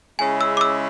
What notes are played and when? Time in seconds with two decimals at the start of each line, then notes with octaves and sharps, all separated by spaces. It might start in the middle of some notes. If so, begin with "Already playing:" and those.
0.19 C#3 G#3 C#4 E4 G#5
0.41 E6
0.57 D6
0.61 E6